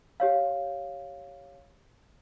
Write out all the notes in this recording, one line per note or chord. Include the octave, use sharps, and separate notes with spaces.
G4 C#5 F5